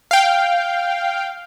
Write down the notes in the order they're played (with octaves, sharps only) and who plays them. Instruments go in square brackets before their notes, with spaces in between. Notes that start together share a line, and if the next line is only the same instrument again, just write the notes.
[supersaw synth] F5 G5